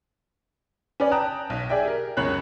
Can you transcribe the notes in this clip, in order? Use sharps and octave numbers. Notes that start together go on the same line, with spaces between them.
C#4 B4 D5
G5 A5 A#5 D#6 F#6
B1
G#4 D5 E5 G5
G4 A#4
C#2 F#2 C#5 B5 F#6 F#7